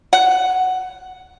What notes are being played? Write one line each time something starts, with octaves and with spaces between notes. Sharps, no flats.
F#5